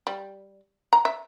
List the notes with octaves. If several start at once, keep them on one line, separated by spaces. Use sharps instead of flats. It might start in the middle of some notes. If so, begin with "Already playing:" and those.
G3
A#5
E5